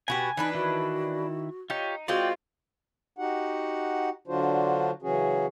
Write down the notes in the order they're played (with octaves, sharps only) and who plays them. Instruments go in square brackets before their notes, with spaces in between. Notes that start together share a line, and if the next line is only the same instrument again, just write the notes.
[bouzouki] B2 F#4 G4 [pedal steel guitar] G#5
[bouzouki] E3 D4 B4 [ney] D#4
[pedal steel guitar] D#3 E4 [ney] F#4
[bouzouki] D#4 [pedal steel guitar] F4 G4 C#5
[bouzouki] G#3 C4 F4 [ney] F#4 [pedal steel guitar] D5 G5
[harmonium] D#4 F#4 G4 F#5
D3 F#3 D4 F4 F#4 C5
C#3 E3 F#3 C#4 F#4 G#4